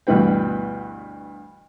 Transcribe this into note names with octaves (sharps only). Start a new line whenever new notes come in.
D2 G2 B2 E3 B4 G5